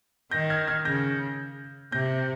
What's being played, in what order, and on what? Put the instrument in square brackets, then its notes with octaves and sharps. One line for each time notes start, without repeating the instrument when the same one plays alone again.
[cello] D#3 [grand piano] G6 A#6
[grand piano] F6 G#6
F6 G#6
[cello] C#3 [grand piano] G6 A#6
[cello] C3 [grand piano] G6 A#6